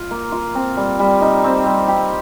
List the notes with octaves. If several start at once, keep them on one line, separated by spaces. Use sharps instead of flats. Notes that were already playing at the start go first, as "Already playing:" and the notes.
Already playing: F4
A#3
F4
C4
G3
G3
D#4
C4
G3
G4